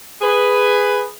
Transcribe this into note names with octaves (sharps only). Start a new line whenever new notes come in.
G#4 B4